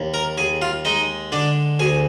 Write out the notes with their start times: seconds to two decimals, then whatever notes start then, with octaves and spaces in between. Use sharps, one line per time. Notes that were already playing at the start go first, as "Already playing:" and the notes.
Already playing: D#2
0.14 A#4 A#5
0.38 D#2 G#4 G#5
0.62 F4 F5
0.85 G#3 D#4 D#5
1.32 D3 D4 D5
1.79 D2 G#4 G#5